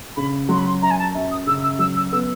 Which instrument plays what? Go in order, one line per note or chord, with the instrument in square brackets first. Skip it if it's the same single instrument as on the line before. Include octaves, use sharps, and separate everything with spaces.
[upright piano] C#3 [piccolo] B5
[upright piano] F#3 [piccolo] C6
[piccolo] B5
C6
[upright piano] F#2 [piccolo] A#5
[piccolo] G#5
A5
[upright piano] F#2
[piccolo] D#6
[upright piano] C#3 [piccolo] E6
[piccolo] E6
[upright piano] F#3 [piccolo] E6
[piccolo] E6
[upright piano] B3 [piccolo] E6